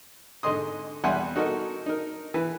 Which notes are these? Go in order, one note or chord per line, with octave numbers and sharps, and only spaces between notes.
G#2 D3 D#5 C6 D#6
E2 G3 E5 F#5 G#5 C6
D#4 F#4 A4 A#4 D#5
D#4 A#4
E3 B4